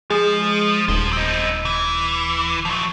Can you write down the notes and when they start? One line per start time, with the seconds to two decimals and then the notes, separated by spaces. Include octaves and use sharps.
0.10 F3 G#3
0.88 D#1 A4 C5
1.13 C4 D#4
1.65 E3
2.65 F3 F#3